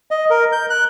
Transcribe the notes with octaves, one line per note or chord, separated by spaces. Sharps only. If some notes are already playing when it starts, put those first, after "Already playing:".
D#5
A#4
G6
F#6